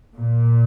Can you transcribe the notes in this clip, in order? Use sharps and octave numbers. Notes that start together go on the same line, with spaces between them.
A#2